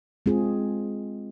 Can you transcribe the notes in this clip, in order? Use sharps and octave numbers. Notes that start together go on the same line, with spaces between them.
G#3 C4 F4 G#4